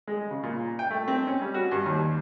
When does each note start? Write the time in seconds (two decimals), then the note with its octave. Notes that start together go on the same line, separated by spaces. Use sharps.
0.07 G#3
0.30 C#3
0.43 A#2
0.79 G5
0.91 A3
1.08 C4
1.27 C#4
1.42 G3
1.54 F#4
1.71 G2
1.86 D#2